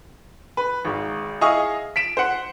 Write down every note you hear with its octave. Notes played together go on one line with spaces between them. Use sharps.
B4
G#1 G#2
E4 G#4 D#5 F5 C#6 D#6
B6 D7 E7
C5 F#5